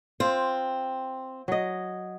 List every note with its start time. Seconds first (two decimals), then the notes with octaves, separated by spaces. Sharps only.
0.20 C4 F4
1.48 F#3 D#5